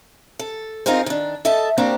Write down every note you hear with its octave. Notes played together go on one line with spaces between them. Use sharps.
A4
C4 D#4 F4 G#4 A#4 C5
D#3 D4
A4 D#5 E5 A5
A#3 C4 D4 F#4 G4 C5